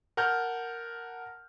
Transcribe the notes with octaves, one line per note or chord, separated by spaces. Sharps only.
A#4 F#5 A5 F6 G6